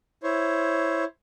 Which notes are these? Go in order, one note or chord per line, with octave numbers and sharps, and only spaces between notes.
E4 C5 C#5